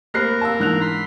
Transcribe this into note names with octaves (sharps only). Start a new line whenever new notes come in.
A#3 G4 A#4 C5 B5 F6 F#6 C7
F5 A5 E6
G#2 E3 D4 F#6 F7
B5 C6